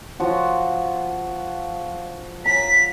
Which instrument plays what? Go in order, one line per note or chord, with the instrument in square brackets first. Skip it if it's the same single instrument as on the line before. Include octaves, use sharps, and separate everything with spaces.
[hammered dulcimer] F3 F#4
[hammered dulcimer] A#5 [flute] B6